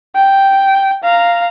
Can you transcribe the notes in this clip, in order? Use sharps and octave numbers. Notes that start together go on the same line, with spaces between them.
G5
F5 A#5